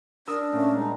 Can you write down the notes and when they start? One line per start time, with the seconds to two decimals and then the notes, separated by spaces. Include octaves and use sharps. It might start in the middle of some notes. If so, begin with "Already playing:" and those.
0.27 D4 A#4 D#6 E6
0.53 A#2 A3 C#4
0.72 G3 G#3 D#4